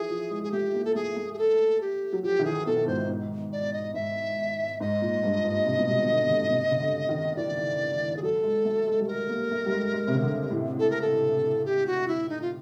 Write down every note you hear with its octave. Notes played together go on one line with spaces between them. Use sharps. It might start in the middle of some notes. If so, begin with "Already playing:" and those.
Already playing: E3 F3 G#4
F3
G#3
G#3 G#4
A3 G4
A#3
A4
A3 G#4
A3
G#4
A4
G4
F#3
F3 G4
D#3
E3 G#4
B2 A4
G#2 C5
G#2
D5
D#5
G#2 E5
G#2 D#5
A#2
G2
G#2
C3
B2
C3
D#3
D3
D3
C3
C#3
D3
D#3
E3 D5
G#4
F#3 A4
G#3
A3
G#3
G3
A4
G#3 A#4
A#3
A3
G3
G#3
G#3
C3
C#3
D3
A2
A4
A#4
A4
G4
F#4
E4
D#4
F4